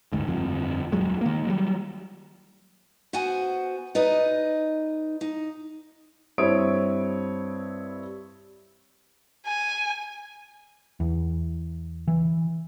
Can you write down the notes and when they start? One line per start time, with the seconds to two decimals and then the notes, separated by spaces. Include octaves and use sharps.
0.12 G1 D2 G#2
0.27 G1 F2 F3
0.92 D#1 F#3 G#3
1.21 D#3 A#3
1.47 F#3 G3
3.13 B3 F#4 C5 F#5 G#5
3.95 D#4 B4 D5 D#5
5.21 D#4
6.38 G2 C4 E4 C#5 D#6 D7
9.47 G#5
11.00 E2
12.08 E3